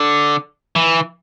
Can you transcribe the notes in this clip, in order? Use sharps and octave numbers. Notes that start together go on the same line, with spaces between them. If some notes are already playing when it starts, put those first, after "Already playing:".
Already playing: D3
E3